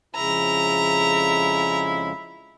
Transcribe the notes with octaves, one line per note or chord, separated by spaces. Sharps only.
F2 C#3 G#3 E4 A#5